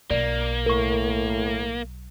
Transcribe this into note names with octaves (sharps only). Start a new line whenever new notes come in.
B1 A#3 D5
A2 A#4 C#6